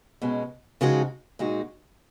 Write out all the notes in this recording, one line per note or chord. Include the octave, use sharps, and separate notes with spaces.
B2 G#3 C#4
C#3 F3 G#3 D#4 F#4
A#2 G#3 D#4 F#4